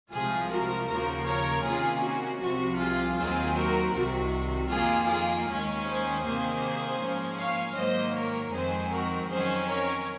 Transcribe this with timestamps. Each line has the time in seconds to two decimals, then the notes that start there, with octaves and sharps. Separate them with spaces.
0.12 C2 C3 F3 G#3 F4 G#4
0.50 F#4 A#4
0.88 D#2 C#3 F3 A#3 F#4 A#4
1.27 A#4 C#5
1.65 C3 D#3 A#3 C#4 F4 G#4
2.02 F#4
2.41 C2 C3 F3 F#4
2.79 F4 G#4
3.17 D#2 D#3 F#3 C4 F4 G#4
3.56 F#4 A#4
3.94 C2 C3 D#3 F#4
4.70 F2 D#3 A#3 F4 G#4
5.09 F4 G#4
5.47 D#2 D#3 G#3 C#4
5.85 G#4 C5
6.24 C3 D#3 A#3
7.00 G#2 F3 A#3 C#4
7.37 C#5 F5
7.76 G#2 D#3 F#3 A#3 C5 D#5
8.14 A#4 C#5
8.52 F2 D#3 G#3 C4 G#4 C5
8.91 F#4 A#4
9.29 F2 D#3 F#3 C#4 G#4 C5
9.67 A#4 C#5